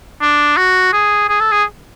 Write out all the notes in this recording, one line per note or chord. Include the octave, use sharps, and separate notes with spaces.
D4
F#4
G#4
G#4
A4
G#4